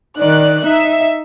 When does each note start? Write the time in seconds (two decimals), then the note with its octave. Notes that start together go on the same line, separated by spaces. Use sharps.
0.17 D#3 D5 F#6
0.66 D#4 E5